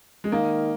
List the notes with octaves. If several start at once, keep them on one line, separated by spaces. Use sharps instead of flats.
G#3
D#3 A#3